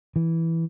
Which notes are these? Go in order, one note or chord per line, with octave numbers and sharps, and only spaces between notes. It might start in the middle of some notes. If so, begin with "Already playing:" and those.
E3